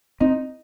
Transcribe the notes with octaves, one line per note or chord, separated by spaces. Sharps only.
C4 D#4